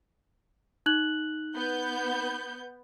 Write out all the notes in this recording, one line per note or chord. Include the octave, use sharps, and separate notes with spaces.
D#4 F#6 F#7
B3 G6